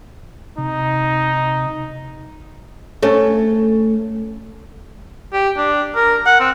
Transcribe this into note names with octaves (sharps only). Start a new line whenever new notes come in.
C3 D#4
A3 C#4
G4
D4
A#4
F#5
C4